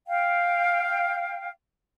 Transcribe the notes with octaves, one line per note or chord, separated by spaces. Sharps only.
F5 G5